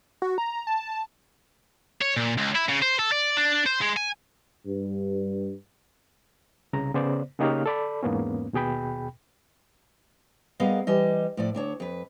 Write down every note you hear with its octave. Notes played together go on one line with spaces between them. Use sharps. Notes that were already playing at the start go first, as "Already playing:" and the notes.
F#4
A#5
A5
C#5
A#2
C#2
E4
C#3
C5
A4
D5
D4
C5
G#3
G#5
G2
C2 C#3 A#5
C#3 B3 C5 D5
C#3 A#3 D#4 G4 C#5 F6
A4 D5 B5
E2 G#2 A#3 B3 C#4
D#2 B2 G#4 G5 B5
G3 B3 G#4 A#4 D#5 F5
E3 G3 D#5
A2 F3 D5
D2 D4 C#5
F2 B4